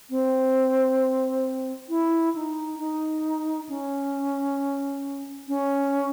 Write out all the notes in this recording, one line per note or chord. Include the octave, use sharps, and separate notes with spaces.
C4
E4
D#4
D#4
C#4
C#4